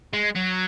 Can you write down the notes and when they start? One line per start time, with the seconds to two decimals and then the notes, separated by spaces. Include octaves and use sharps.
0.13 G#3
0.36 F#3